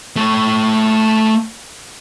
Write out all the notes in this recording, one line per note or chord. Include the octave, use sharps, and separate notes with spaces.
A3 C#5